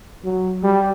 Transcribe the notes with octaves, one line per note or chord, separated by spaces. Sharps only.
F#3
G3